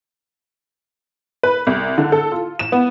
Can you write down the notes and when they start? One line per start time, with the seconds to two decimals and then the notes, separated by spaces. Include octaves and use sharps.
1.43 B4
1.67 C2
1.98 D3
2.12 A4
2.32 F4
2.59 E7
2.72 B3